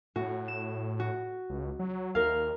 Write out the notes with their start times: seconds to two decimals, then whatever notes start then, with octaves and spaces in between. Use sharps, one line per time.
0.16 A2 F#4
0.48 E7
1.00 F#4
1.50 C#2
1.79 F#3
2.15 D#2 A#4 F5